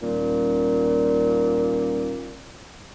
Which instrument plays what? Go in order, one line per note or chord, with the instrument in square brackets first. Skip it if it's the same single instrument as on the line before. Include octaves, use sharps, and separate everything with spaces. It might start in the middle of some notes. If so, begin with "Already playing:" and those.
[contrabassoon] D#1 [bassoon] A#2